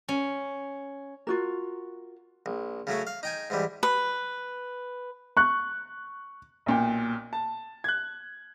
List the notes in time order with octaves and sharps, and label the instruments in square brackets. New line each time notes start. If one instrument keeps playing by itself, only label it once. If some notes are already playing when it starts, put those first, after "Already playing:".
[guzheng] C#4
[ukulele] F4 F#4 A#4
[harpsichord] A#1
C#3 F#3 A3 C#4
F5
D#4 G5 G#5
G#2 E3 G3
[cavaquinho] B4
[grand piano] C#6 F#6
[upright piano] B1 A#2 G5
A5
F#6 G#6